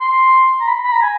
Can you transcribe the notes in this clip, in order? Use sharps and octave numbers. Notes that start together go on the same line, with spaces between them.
C6
A#5
B5
B5
A#5
G#5